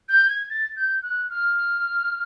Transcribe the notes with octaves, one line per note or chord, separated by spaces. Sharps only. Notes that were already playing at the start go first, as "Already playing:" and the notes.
G6
G#6
A6
G6
F#6
F6